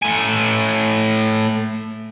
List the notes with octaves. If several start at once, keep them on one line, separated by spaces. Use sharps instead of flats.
A2 G#5